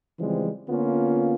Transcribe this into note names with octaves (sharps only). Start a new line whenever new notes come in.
C#3 E3 F3 G3 G#3 C4
D3 A#3 B3 C#4 F4